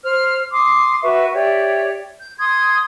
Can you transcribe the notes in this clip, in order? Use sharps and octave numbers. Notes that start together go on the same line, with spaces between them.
C5 F6
C6 D6 D#6
F#4 B4 E5 C#6
G4 C#5 D5 E5
G6
C6 D#6 G#6